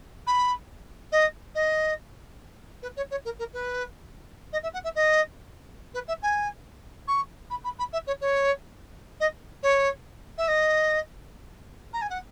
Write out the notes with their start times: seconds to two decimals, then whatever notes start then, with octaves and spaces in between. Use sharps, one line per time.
0.26 B5
1.12 D#5
1.54 D#5
2.82 B4
2.96 C#5
3.10 C#5
3.24 A#4
3.38 A#4
3.53 B4
4.52 D#5
4.63 E5
4.73 F#5
4.84 E5
4.95 D#5
5.94 B4
6.07 E5
6.22 G#5
7.07 C#6
7.50 B5
7.64 B5
7.78 B5
7.92 E5
8.06 C#5
8.21 C#5
9.20 D#5
9.62 C#5
10.37 E5
10.47 D#5
11.93 A#5
12.01 G#5
12.09 F#5